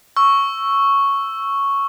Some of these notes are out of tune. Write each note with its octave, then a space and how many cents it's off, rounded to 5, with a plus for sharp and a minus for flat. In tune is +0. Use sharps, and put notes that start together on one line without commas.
C#6 +0 E6 +5